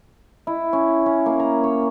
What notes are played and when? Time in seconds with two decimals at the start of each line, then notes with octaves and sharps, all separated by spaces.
0.47 E4
0.73 C#4
1.06 C#4
1.26 A#3
1.39 A#5
1.64 C#5